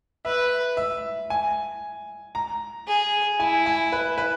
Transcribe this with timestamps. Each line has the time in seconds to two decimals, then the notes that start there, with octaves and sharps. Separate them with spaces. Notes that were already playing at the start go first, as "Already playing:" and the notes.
0.25 B4 E5
0.77 E5
1.30 G#5
2.35 A#5
2.87 G#4
3.39 E4 G#5
3.66 G#5
3.92 B4
4.18 B4